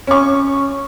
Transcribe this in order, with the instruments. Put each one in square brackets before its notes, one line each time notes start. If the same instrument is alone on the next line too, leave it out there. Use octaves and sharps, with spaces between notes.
[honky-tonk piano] C#4 C#6